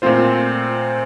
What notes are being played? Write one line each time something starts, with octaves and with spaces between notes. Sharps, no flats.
A#2 A3 C4 F4 C5